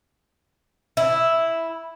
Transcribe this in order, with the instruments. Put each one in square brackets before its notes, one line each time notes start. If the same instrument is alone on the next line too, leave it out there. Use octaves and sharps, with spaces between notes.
[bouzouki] E4